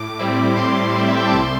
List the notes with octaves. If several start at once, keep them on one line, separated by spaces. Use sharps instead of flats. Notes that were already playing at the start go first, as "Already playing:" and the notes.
Already playing: A2 D6
G3 C4 E4
A2 C6
G3 C4 E4
E5
G5
A5
C2 C6